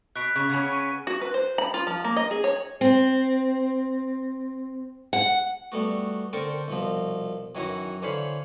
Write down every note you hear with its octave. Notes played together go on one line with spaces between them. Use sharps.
B2 F#6 B6 D7
C#3
C#3 B3 C#4
C#6 D#7
F#4
B4
C5
B5
F4
F3
A#3
D#5
G#4
C#5
C4
F#5
G3 A3 B3 F#4
D3 C4 A#4 G5 A5 C#6
C2 B2 F3
F#2 D#3 E3 E4 F#4 A#5
D3 E3 C5 C#5 F5 B5